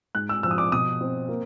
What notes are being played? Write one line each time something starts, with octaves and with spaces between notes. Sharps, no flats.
G#2 F#6
E6
F3 E6
D#6
D6
B2 D#6
C4
A#3